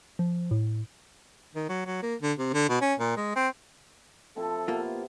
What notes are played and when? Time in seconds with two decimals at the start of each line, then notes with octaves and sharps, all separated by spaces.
0.19 F3
0.51 A2
1.56 D#3
1.69 F#3
1.86 F#3
2.03 A#3
2.22 D3
2.39 C3
2.54 D3
2.69 B2
2.82 C#4
2.99 A#2
3.17 G#3
3.36 C4
4.36 F3 C4 E4 A4
4.68 C3 A#3 B3 F4